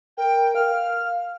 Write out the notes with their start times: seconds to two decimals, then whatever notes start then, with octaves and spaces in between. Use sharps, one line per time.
0.17 A#4 G5
0.55 F5 F6